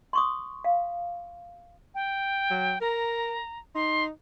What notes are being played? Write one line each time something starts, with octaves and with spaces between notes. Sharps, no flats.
C6 C#6 D#6
F5
G5
F#3
A#4 A#5
D#4 C6